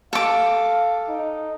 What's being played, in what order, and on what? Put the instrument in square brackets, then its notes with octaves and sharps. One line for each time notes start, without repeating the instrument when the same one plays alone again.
[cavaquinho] A4 D6 [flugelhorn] F5
[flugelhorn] D#4